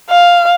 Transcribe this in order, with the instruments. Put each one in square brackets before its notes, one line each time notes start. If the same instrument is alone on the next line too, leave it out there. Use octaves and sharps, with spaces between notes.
[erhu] F5